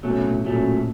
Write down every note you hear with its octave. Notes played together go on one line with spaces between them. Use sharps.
B2 F#3 A3 C#4
A2
A#2 F#3 A3 C#4